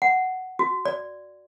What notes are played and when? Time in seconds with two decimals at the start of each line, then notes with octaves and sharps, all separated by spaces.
0.02 F#5
0.59 F#4
0.85 D5